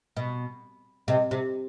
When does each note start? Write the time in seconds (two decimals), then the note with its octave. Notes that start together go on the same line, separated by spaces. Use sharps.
0.17 B2
1.08 C3 D#5
1.31 C3